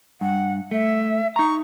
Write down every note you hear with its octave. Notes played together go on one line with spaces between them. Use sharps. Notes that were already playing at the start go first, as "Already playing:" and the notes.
G2 F#5
A3 E5
D#4 A#5 C#6